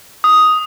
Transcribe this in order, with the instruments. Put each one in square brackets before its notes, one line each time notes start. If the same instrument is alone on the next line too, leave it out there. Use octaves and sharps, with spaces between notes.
[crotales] D#6